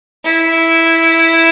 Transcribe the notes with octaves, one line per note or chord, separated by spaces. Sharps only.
E4